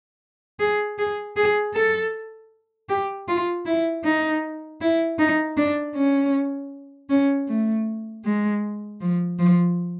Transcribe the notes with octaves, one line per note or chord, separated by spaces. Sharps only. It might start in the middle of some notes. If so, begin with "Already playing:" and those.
G#4
G#4
G#4
A4
G4
F4
E4
D#4
E4
D#4
D4
C#4
C#4
A3
G#3
F3
F3